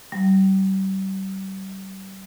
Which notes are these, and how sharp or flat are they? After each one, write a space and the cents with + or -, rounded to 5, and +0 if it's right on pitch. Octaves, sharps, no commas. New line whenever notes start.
G3 -35